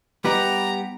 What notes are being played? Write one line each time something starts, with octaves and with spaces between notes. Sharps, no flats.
G3 B3 D#4 G4 B4 A#5